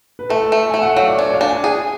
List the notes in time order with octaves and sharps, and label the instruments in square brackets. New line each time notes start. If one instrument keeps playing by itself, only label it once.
[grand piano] B4
[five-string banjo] A3 [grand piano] A4
[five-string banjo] A3
[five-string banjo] A3 [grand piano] G#5
[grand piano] F#5
[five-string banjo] F#3 [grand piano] F5
[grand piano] D5
[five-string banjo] D4 [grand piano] C#5
[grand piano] D5
F5
[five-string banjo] D4
[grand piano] G#5
[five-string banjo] G#4 [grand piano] G#5